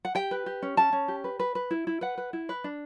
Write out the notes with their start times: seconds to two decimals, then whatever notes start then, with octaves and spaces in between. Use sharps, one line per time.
0.05 F#5
0.15 G4 G5
0.31 B4
0.46 G4
0.62 C#4
0.77 C#4 A5
0.93 C#4
1.08 G4
1.24 B4
1.40 B4
1.55 B4
1.71 E4
1.87 E4
2.01 B4 F#5
2.18 B4
2.33 E4
2.49 B4
2.64 D4